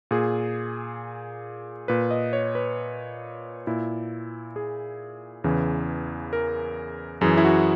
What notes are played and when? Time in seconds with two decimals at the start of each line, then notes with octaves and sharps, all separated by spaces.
0.11 A#2 G#4
1.88 A#2 B4
2.11 D#5
2.33 C#5
2.55 B4
3.67 A#2 E4
4.56 G#4
5.44 E2 C#3 E3
6.33 A#4
7.21 F#2 E3 G#4
7.37 E4
7.45 F#4